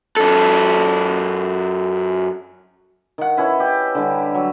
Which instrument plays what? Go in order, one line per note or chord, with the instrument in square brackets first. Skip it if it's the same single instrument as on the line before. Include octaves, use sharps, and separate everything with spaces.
[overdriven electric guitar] F#2 A4
[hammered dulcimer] D#3 F#5
C#4 E4 B4
G4
D3 G3
F#3